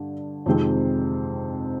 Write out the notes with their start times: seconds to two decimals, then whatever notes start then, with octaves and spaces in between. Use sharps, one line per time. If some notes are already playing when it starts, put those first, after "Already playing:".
Already playing: G2 D3
0.46 F2 C3 D#3 G#3 C4